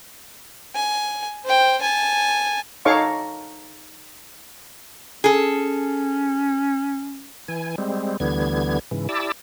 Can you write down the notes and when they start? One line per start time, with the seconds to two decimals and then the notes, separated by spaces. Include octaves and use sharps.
0.75 G#5
1.45 C5 G5
1.82 G#5 A5
2.85 D#4 A4 C#5 F5 C#6 D6
5.24 C#4 G#4 A4
7.48 E3 G#5
7.78 G3 G#3 C4
8.20 D2 D3 E3 G3 B3 G#6
8.91 G#2 C#3 E3
9.09 E4 G4 D5 A5 D6 E6